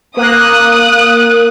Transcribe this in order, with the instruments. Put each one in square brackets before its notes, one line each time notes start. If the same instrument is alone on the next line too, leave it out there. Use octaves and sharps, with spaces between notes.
[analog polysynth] A#3 [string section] D#6 F#6